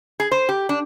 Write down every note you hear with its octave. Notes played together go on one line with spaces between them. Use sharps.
G#4
C5
G4
D4